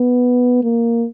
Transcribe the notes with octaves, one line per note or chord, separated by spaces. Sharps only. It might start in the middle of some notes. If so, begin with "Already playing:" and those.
Already playing: B3
A#3